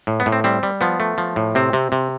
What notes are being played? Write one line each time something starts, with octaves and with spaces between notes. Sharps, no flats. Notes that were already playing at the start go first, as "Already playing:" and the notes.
A2
B3
A2
C4
G3 C4
G3
F3 B3
A3
F3
A2
C3 C4
C3
C3